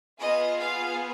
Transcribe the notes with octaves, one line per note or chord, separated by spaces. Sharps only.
B3 F4 G#4 D#5
F5